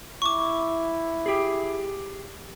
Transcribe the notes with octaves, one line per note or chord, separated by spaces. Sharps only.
E4 C#6 D6
G4 G#4